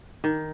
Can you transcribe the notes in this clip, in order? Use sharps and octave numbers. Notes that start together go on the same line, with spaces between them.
D#3